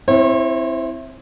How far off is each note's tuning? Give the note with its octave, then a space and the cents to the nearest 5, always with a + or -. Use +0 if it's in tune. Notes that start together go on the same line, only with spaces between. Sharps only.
C4 +0 E4 +0 C#5 -40